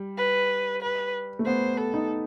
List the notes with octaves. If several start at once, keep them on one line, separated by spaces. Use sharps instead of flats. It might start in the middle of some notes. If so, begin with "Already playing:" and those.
Already playing: G3
B4
B4
A3
B3 C5
A4
D#4